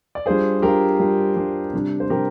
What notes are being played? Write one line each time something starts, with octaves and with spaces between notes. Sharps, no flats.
D5
G3 D4 F4 G#4 C5
G3 D4 F4 G4 A#4
G3 D4 F4
G3 D4 F4 G4
C3 G3 D4
C5
C3 G3 D4 G4 A#4